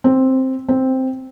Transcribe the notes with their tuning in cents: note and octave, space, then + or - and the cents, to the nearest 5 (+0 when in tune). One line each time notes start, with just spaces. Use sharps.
C4 +5
C4 +0